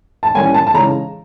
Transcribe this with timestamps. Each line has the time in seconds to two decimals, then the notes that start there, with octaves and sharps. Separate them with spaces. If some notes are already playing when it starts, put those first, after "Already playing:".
0.23 A5
0.34 E3 G3 A#3 C#4 G#5
0.54 A5
0.67 A5
0.74 C#3 E3 G#3 C#4 A#5